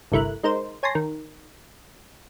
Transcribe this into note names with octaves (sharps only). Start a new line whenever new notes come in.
G1 C2 A3 E4 A#4 F#6
G#3 D#4 A#4 C5
C#5 G#5 A5 C6 A#6
D#3